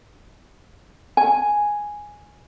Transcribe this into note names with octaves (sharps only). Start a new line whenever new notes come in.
G#5